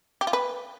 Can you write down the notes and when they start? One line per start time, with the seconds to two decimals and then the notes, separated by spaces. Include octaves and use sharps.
0.21 G4
0.27 F4
0.33 B4